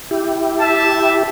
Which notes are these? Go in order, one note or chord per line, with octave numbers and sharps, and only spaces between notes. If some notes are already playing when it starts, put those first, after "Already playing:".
E4 G4
E5 A5